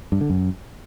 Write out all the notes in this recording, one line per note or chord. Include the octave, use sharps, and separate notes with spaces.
G2
D3
F#2